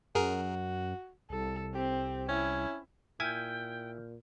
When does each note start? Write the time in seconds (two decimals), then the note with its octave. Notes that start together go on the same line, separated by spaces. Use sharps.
0.15 F#2 F#4 G#4 A#4
1.30 C2 A4
1.75 C4 G4
2.29 C#4 E4
3.20 A#2 E4 G5 G#5 F6 G6